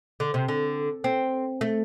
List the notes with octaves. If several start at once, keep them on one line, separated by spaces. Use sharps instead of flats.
D3
C3
D3
C4
A3